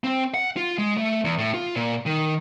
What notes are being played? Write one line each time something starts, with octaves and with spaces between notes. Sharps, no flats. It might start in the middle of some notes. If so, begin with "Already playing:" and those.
C4
F#5
F4
G#3
A3
E2
A2
F4
A#2
D#3